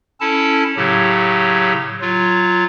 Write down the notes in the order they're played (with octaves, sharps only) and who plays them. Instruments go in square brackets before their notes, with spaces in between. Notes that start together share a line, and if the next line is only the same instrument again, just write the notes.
[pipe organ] C#4 E4 A4 A5
A2 C#3 F#3 G4
F#3 F4